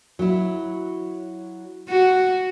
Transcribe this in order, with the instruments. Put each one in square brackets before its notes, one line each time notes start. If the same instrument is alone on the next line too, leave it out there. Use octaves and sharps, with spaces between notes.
[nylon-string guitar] F#3 E4
[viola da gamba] F#4